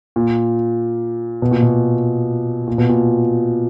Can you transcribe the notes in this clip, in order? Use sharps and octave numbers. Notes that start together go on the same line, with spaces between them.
A#2
B2
A#2
B2
A#2
B2
A#2